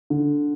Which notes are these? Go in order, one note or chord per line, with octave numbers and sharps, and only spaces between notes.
D3